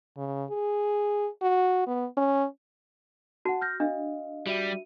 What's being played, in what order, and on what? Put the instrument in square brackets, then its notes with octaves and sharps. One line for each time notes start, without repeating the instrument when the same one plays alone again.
[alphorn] C#3
G#4
F#4
B3
C#4
[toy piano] F#4 [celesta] F#5 A5
[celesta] F6 G6 A#6
[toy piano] D4 [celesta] D#5 F5
[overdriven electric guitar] G3 [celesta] F#4 E5 D#7